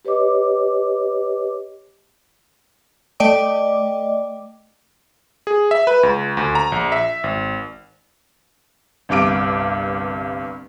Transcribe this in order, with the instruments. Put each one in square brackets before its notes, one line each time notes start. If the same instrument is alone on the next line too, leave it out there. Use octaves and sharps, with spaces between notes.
[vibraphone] G4 B4 C#5 D#5 D6
[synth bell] A3 D5 D#5 G5 D6
[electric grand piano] G#4
E5
B4
C#2
D2
A#5
A#1
E5
G#1
[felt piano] G1 C2 G2 D6 D7